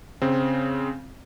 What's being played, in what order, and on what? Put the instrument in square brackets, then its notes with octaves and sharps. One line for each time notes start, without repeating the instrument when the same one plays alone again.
[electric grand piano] C#3 C4